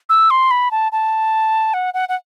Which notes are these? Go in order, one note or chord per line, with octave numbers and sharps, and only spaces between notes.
E6
C6
B5
A5
A5
F#5
F#5
F#5